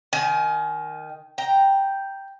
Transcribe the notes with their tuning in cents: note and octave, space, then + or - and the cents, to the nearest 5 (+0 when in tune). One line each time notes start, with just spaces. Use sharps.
D#3 +0 G#5 +30
G5 +0 A#5 +5